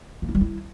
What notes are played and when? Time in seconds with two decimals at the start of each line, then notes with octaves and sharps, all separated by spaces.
0.22 A#3
0.28 E4
0.35 G3
0.41 E4